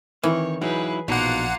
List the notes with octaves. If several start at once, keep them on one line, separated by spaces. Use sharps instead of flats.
D#3 E3 C4 C#5
F#3 D#4 E4 G#4 B4
A#1 B2 A#3 D#4 F4 F#5